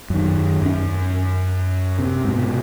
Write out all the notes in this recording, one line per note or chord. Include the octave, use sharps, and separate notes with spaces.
F#2 D#3
F#2 C#4
C3
G#2 B2